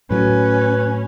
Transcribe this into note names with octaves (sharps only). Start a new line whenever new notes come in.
A2 F#3 C#4 B4